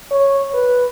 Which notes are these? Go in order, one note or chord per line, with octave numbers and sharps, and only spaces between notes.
C#5
B4